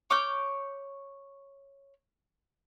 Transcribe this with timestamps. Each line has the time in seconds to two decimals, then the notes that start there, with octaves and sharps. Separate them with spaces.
0.10 C#5 D6 F6 G6